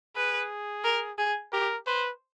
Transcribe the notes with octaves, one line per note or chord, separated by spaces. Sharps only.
G#4 B4
A#4
G#4
G4 A#4
B4 C5